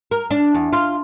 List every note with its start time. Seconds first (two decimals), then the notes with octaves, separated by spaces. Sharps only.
0.11 A#4
0.31 D4
0.54 E2
0.73 F4